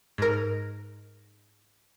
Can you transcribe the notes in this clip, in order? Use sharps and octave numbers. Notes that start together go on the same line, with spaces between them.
G#2 A#4